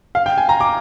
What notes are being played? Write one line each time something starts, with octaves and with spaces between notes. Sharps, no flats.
F5
G5
G#5
A#5
D6